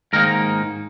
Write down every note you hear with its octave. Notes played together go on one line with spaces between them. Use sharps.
G#2 D#3 A#3 D#4 A#4